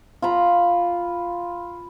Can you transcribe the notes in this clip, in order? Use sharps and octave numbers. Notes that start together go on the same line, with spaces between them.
F4 A#5 B5